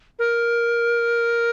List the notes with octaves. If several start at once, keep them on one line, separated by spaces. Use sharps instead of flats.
A#4